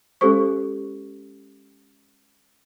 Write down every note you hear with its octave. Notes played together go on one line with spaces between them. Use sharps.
G#3 C#4 G4 A4 C5 C#6